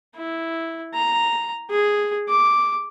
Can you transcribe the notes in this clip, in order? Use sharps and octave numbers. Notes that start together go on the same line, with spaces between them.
E4
A#5
G#4
D6